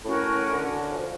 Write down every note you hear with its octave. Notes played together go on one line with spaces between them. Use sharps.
A2 C#4 F#4 A#4
D3
F#3
F3